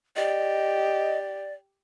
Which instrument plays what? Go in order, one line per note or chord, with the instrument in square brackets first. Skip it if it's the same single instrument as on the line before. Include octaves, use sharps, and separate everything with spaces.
[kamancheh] G4 [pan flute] D5 [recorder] D#5